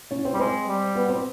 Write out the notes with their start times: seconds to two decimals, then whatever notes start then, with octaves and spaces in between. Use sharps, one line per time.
0.11 C#4 C#5
0.25 C4 C5
0.34 G3
0.39 G#3 C4 C5
0.68 G3
0.95 B3 B4
1.09 C4 C5